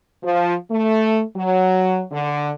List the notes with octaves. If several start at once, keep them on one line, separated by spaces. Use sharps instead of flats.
F3
A3
F#3
D3